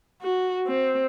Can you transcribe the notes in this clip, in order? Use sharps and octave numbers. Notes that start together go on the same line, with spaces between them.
F#4
C4